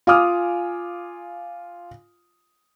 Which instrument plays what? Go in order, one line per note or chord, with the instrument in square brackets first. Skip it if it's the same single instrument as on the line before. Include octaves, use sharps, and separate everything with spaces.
[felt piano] F4 F5 G#5 D6 D#6 F6